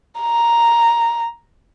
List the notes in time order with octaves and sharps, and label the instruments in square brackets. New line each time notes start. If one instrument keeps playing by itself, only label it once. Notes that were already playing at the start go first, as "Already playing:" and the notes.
[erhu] A#5